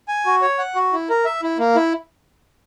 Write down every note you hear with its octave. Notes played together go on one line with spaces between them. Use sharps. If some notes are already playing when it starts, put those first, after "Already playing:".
G#5
F#4
C#5
F#5
F#4
E4
A#4
E5
E4
A#3
E4